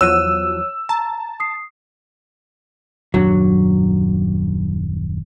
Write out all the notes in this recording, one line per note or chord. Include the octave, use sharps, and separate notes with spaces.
E2 F3 F#3 C#5 E6 F#6 D#7
A5 A#5
D#6 C7
D#1 F#2 F#3 D4